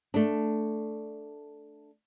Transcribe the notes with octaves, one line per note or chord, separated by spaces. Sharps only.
A3 D4